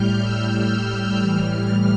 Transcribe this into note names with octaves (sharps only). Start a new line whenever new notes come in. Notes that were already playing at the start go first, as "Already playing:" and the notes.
Already playing: A2 G3 F6 G6
E6
F6
A2 E3 G3